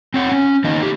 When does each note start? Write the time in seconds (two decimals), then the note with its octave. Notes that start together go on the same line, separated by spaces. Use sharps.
0.14 C4 C#5 F#5
0.32 C#4
0.64 D#3 A#3 B3 D#4 D#5
0.80 A3 G4